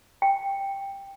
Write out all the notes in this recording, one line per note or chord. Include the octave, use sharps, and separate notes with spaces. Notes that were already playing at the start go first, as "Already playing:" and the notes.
G5